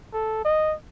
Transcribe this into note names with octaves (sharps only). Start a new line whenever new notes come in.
A4
D#5